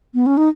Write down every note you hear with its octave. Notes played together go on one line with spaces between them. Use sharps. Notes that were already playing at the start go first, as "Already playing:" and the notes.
B3
C#4
D#4